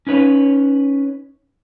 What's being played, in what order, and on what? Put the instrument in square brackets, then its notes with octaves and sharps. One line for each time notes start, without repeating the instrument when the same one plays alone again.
[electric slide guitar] C#4 D#4 B4 C#5